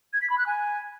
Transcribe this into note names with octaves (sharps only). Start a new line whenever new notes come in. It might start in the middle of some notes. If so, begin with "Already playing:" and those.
G#6
B6
B5
F#6
G#5